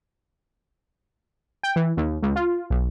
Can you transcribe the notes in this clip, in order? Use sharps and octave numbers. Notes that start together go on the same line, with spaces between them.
G5
E3
D#2
C#2
F4
B1